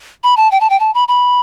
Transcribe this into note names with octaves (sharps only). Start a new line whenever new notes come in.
B5
A5
G5
A5
G5
A5
B5
B5